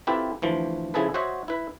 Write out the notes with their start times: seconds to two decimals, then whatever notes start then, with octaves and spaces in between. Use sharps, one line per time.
0.07 C4 E4 F4 G4 A4 B4
0.42 D2 E3 F3
0.94 C#3 F3 E4 G#4 A4 B4
1.14 F#4 C5 C#5 D#5 E5 F#5
1.48 E4 B4